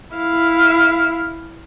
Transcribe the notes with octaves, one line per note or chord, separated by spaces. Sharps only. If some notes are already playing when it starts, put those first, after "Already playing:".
E4 F5